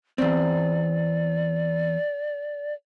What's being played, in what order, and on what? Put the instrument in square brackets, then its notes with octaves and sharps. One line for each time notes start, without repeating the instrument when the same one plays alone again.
[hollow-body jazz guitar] E2 C4 [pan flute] D5